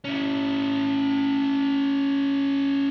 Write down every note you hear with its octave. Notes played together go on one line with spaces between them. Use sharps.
C#4 E4